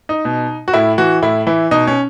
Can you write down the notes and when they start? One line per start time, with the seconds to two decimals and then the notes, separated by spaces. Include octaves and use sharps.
0.09 D#4
0.25 B2
0.68 F#4
0.73 A2 E4
0.98 E3 F#4
1.22 A2 E4
1.47 E3 E4
1.71 B2 D#4
1.87 C#4